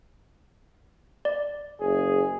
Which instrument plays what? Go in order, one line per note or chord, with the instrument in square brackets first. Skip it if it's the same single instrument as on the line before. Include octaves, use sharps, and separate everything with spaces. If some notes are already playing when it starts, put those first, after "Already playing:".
[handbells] D5
[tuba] F#1 [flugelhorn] G#4